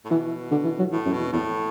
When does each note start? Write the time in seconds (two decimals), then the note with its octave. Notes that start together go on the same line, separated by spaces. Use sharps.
0.05 A2
0.10 B2 E3
0.51 D3
0.64 E3
0.79 F#3
0.92 A2 E3
1.05 F#2
1.12 B2
1.19 E2
1.32 E2 A2